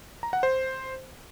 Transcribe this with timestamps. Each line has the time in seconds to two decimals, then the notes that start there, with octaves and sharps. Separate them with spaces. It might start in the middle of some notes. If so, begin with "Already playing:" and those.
0.23 A#5
0.33 F#5
0.43 C5